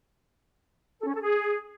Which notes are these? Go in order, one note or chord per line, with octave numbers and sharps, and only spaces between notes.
A4
C#4
A4
G#4